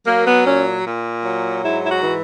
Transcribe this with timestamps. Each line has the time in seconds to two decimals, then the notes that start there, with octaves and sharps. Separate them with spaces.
0.06 F#3 A#3
0.26 B3
0.46 A#2 C#4
0.85 A#2
1.24 F#3
1.63 G#2 E4
1.83 E4
1.90 F#4
2.02 E3